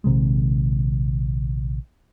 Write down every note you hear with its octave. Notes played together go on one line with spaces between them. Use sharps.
A#1 C3 D#3 G#3